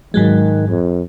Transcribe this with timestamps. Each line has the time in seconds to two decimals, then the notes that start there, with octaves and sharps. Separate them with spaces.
0.14 G#2 D#3 F#3 G#3
0.69 F2